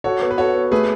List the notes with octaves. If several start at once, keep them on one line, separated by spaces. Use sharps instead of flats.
F#4 A4 C#5
B3
B4
F#4 A4 C#5
B3
A3 G#4 B4